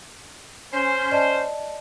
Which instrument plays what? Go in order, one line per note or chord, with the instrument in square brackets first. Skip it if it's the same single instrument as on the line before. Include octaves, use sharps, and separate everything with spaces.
[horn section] C#4 C5
[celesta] D5 D#5 A5